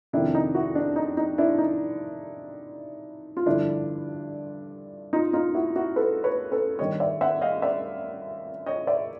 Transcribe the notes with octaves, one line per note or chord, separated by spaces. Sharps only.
F2 C3 D#3 D4 E4
D#4
E4 F#4
D4
D#4
D#4
D4 E4
D#4
F4
G2 D3 F3 D4 E4
D#4 F4
D#4 F4
E4 F#4
E4 F#4
A4 B4
B4 C#5
A4 B4
G2 D#3 G3 C#5 D#5
D5 E5
E5 F#5
D#5 F5
D5 E5
C#5 D#5
D5 E5